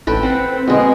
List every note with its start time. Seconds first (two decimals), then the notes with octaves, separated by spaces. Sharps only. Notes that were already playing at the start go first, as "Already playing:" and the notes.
0.07 A1 A4 B4 G5
0.23 C4 F#5 B5
0.67 B2 G#3